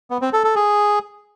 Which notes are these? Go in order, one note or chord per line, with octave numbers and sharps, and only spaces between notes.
B3
C4
A4
A4
G#4